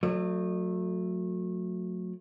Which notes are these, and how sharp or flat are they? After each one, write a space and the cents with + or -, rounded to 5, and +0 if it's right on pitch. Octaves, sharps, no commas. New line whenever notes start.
F#3 -30 A3 +15 D5 +45